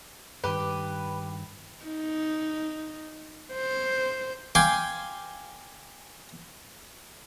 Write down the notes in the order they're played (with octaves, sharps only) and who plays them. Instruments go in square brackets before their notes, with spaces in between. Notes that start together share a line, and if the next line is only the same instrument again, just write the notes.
[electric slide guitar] G2 D#3 [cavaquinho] G4 [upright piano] B4
[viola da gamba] D#4
C5
[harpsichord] F5 G5 G#5 C6 D6